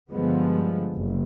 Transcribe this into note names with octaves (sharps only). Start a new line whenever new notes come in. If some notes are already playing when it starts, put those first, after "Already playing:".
G2 D3 F3 G#3 B3
F#1